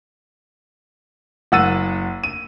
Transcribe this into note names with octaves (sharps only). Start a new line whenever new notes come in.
F#1 F#5 E6 A6 D#7
D#7